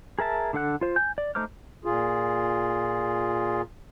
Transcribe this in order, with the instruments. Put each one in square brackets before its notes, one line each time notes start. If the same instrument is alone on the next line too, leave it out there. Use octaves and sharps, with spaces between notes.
[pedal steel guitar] G#4 A#4 E5 A5
D3 D4 A4 F#5 F#6
F4 C5
G#5 G6
D5
A3 D#4 C5 D6 F6
[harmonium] A#2 F4 G#4